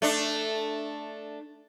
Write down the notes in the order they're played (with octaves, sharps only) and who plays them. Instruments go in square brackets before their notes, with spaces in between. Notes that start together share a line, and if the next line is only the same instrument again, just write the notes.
[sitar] A3 D4